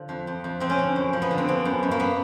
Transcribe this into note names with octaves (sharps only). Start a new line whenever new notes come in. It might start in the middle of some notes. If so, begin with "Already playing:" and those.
Already playing: D3 F3
F2
F2
F2
F2 C4
C#4
D3
F#2
F3
B3
D3
C4
F#2 B3
F#2
F#2
A#3
B3